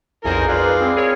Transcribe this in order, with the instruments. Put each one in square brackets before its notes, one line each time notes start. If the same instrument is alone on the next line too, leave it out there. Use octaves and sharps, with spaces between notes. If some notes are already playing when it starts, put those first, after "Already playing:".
[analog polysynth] B1 F2 C5 [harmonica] E3 G#4 A#4
[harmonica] G#3 F4 D5 [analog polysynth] B4
[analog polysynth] C4 E4
G#4 A#4 C#5